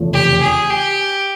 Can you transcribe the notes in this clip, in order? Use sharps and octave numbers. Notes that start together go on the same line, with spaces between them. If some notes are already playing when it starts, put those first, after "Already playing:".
Already playing: F1 E2 C#3 F3 A3
G4
G#4
G4